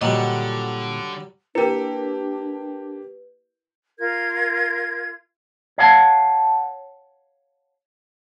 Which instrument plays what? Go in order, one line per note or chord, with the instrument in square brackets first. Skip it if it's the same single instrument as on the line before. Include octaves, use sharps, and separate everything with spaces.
[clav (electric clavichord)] A#2 F#5 [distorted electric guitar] D3 [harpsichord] F#3 G3 [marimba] D#5
[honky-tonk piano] A#3 G4 [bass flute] D4 [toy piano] E4 A#4 [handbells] B4
[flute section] F4 A#4 G#6
[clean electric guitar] C#5 F5 F#5 A5